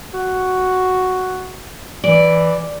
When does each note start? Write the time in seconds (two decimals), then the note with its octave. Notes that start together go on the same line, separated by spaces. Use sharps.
0.14 F#4
2.04 E3 D5